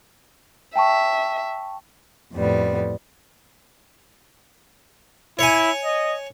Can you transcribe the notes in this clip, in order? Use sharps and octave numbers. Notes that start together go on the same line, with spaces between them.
E5 G5 A5 C#6
F2 A2 G3 B3
E4 C#5 G#5
D#5